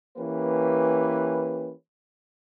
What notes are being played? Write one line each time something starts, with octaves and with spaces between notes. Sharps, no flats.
E3 A#3 C#4 G4 B4